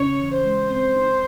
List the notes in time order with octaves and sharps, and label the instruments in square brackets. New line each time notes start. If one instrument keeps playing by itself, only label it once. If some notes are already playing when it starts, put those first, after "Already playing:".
Already playing: [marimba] C#3 C#4 [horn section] C#5
[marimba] E3
[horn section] C5
[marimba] G#3
C4
D#4